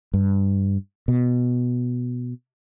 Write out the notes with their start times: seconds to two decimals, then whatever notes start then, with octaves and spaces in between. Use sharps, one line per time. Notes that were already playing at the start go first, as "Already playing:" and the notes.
0.14 G2
1.08 B2